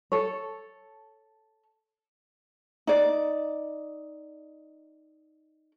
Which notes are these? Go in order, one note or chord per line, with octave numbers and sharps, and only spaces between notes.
A4 C#5
D#4 D5